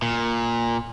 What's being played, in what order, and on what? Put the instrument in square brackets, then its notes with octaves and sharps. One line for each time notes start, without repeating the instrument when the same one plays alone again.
[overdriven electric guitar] A#2